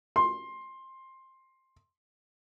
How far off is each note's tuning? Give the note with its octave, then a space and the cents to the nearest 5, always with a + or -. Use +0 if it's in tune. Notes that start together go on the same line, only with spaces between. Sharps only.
C6 +15